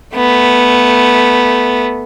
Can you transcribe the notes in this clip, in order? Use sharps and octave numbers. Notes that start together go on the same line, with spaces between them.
A3 B3